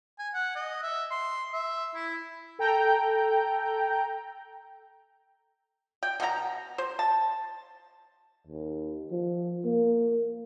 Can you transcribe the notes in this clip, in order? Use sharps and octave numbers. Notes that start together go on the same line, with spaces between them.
G#5
F#5
D#5
E5
C6
E5
E4
A4 G5 A#5 G6
G5
B2 B3 E4 A#5
C5
A5
D#2
F3
A#3